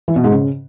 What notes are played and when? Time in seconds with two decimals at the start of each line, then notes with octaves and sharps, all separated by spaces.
0.08 E3
0.16 B2
0.24 G#2
0.32 C#3